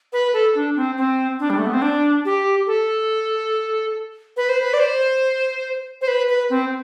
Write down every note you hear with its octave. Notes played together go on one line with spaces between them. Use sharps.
B4
A4
D4
C4
C4
D4
G3
A3
B3
C4
D4
G4
A4
B4
C5
B4
D5
C5
C5
B4
B4
C4